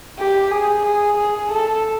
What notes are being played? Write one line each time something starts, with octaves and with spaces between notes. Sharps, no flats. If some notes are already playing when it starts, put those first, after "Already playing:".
G4
G#4
G#4
G#4
A4